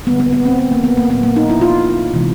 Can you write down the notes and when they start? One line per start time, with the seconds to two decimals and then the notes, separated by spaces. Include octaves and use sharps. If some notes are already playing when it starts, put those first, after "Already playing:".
0.07 D3 G3 A#3 B3
0.20 B3
0.33 B3
0.45 C4
0.59 B3
0.71 A#3
0.84 B3
0.97 A#3
1.10 A#2 F#3 A#3 B3
1.23 A#3
1.36 D#4
1.50 E4
1.61 F4
2.14 C3 E3 G#3